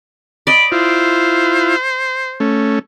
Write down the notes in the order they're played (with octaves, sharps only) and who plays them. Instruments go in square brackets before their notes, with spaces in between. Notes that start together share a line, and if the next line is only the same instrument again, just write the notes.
[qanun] D5 D#5 [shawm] B5
[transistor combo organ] E4 F4 [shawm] C5
[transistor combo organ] A3 C#4